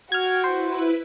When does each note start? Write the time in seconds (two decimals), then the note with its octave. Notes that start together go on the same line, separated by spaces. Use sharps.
0.12 F#4 G5 F6 G#6
0.44 E4 B4 C5